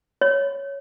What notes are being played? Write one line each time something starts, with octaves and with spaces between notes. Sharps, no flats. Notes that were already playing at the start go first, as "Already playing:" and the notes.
C#5